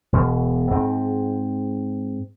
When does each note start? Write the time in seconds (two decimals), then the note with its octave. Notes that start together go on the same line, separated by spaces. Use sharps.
0.13 E1 B2
0.71 G#2 C4